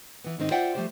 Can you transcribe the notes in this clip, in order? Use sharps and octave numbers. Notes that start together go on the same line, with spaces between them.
E3 B3
G#2 D#3 C4 D#4
F4 C5 D5 E5 F#5 G5
F3 G3 A3 G4 C5